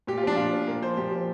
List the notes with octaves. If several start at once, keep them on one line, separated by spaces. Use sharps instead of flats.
A#2 G4
F4
F3 D4
A#2 F4
F3
A#2 A#4
F3 C5
A#2 G4
F3